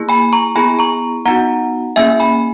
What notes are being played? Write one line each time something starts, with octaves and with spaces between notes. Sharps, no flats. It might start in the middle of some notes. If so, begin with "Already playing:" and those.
Already playing: A#3 E4 G#4
G#5 B5
A#5 C#6
B3 E4 G#4 G#5 B5
A#5 C#6
B3 D#4 F#4 F#5 A#5
A#3 C#4 E4 G#4 E5 G#5
G#5 B5